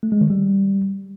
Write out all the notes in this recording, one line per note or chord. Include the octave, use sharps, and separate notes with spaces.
A3
G#3
D#3
G3